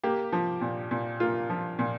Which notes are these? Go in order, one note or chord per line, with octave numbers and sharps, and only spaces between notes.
A#3 G4
F3
A#2
A#2
A#3 F4
F3
A#2